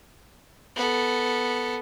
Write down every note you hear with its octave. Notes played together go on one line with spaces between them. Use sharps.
B3 A4